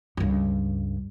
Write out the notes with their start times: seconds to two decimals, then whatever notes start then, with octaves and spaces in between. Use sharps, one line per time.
0.17 C#2 G2